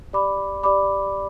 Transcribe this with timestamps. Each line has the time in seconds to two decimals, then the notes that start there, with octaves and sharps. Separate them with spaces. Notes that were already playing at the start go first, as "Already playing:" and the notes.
0.13 G4 D5 B5 D6
0.63 G4 D5 B5 D6